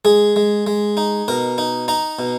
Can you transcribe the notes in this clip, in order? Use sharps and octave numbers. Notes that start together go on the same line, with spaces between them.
G#3 G#4
G#3
G#3
D#4
B2 A#4
D#4
D#4 A#5
B2